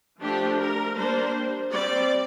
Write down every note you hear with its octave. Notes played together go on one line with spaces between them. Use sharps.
F3 A3 D4 G4
A#4
G3 A#3 D4 C5
G3 C4 D5